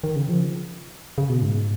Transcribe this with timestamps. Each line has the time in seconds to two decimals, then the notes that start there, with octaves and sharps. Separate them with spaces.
0.04 D#3
0.16 C#3
0.29 F3
1.18 C#3
1.29 B2
1.42 G#2